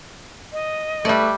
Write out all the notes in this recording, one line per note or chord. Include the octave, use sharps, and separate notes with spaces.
D#5
G3 A3 B4 D5